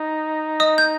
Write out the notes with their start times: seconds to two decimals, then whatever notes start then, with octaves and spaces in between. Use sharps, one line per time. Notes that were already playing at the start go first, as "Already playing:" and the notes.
Already playing: D#4
0.60 D#5 D#6
0.78 G6